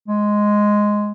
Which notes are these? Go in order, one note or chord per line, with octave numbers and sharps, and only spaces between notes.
G#3